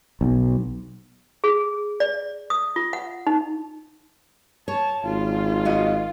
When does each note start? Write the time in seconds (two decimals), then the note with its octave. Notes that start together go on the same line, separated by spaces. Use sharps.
0.21 B1
1.44 G#4
2.00 D5
2.50 D#6
2.76 F4
2.93 F#5
3.27 D#4
4.68 C#5 A5
5.04 G#1 F4
5.65 F#4 D#5 F5